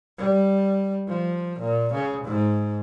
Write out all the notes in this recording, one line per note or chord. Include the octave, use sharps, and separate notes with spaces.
G3
F3
A#2
C#3
G#2